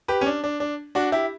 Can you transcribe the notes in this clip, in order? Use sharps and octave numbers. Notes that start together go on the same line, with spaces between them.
G4 B4
C#4
D4
D4
D4
D4 F#4
E4 G4